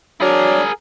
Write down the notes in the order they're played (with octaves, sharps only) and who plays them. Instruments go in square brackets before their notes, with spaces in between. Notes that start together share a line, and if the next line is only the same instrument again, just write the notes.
[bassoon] F#3 [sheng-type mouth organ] D4 D5 [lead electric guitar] G#4 A#4